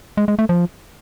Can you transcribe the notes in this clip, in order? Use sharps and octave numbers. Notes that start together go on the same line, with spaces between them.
G#3
G#3
A3
F3